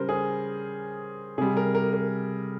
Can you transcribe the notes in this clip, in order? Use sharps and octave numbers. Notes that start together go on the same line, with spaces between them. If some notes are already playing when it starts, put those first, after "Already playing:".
Already playing: C#3 G3 A#4 C5
G#4
C3 G3 G#4
A#4
A#4
A#4